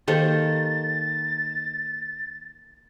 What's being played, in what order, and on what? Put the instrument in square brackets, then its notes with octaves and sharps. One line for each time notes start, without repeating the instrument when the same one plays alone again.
[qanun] D#3 A#3 [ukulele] G4 A4 C5 [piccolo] A6